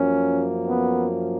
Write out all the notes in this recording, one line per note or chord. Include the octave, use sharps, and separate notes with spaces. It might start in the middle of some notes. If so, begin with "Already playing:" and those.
Already playing: F#2 F3 A#3 C#4
B3